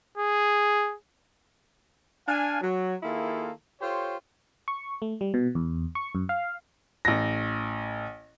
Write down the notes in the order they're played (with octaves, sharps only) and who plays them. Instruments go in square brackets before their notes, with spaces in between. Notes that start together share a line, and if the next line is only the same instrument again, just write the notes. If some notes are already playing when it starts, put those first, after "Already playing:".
[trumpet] G#4
[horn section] D4 F5 G#5
F#3
D#3 A#3 E4 F4 G#4 A4
F4 G4 A4 C5 C#5
[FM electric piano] C#6
A3
G3
B2
E2
C#6
F#2
F5
[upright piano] A1 A#6